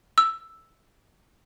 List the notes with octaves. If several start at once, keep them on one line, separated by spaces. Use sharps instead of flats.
E6